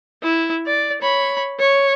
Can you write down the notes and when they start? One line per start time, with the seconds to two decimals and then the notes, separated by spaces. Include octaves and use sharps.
0.22 E4
0.66 D5
1.01 C#5 B5
1.60 C#5